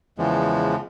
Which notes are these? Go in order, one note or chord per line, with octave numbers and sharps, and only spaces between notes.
E2 C#3 E3 F3 G#3